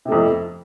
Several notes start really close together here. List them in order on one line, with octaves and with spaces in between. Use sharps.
C3 A3 F2 F3